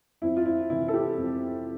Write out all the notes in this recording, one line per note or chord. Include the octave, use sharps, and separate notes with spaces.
F2 E4
F4
E4
C3 E3 E4
A4
G4
F2